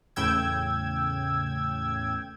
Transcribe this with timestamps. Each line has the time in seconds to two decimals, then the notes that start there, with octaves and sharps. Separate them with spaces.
0.16 E2 A2 C#3 G5 E6 G#6